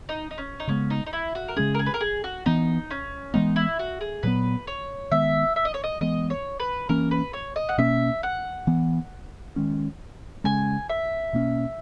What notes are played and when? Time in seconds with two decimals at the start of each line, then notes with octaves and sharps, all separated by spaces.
0.09 D#4
0.31 D#4
0.38 C#4
0.60 D#4
0.67 C#3 G#3 B3 C#4
0.90 D#4
1.06 D#4
1.13 E4
1.35 F#4
1.48 A#4
1.56 C#3 G#3 C#4 G#4
1.74 A#4
1.79 G#4
1.86 B4
1.94 A#4
2.01 G#4
2.24 F#4
2.46 E3 B3 D#4
2.91 C#4
3.34 E3 G#3 B3 D#4
3.56 E4
3.79 F#4
4.01 G#4
4.23 A#2 F#3 B3 B4
4.67 C#5
5.11 D#3 G#3 B3 E5
5.56 E5
5.65 D#5
5.74 C#5
5.84 D#5
6.01 E3 G#3 B3 D#5
6.30 C#5
6.60 B4
6.89 E3 A#3 C#4 A#4
7.11 B4
7.33 C#5
7.56 D#5
7.69 F#5
7.78 B2 A#3 C#4 E5
8.23 F#5
8.67 E3 B3
9.56 D#3 G#3 C#4
10.44 C#3 G#3 C#4 G#5
10.90 E5
11.33 B2 A#3 C#4